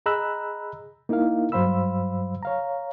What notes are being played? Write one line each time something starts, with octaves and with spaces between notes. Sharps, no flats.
G#4 D#5 A#5 B5 E6 F#6
A#3 D#4 E4 A#4 F5
G2 F#3 C5 F5 B5 E6
C#5 F5 A#5